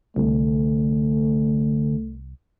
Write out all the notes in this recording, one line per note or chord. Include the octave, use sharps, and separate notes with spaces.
C2 D3 A3